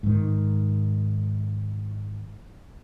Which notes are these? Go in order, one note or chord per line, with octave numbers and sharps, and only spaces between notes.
G#2 D#3